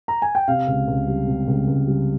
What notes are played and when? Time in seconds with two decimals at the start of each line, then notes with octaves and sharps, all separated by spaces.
0.08 A#5
0.22 G#5
0.35 G5
0.48 C3 F5
0.67 C#2
0.88 C#2
1.07 G3
1.27 C3
1.48 C#2
1.67 C#2
1.87 G3